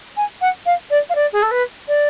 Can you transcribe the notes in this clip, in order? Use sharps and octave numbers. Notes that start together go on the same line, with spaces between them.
G#5
F#5
F5
D5
F5
D5
G#4
A4
B4
D5